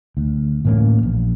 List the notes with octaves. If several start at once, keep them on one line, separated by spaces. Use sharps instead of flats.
D2
A2 E3 A#3 C#4
A#1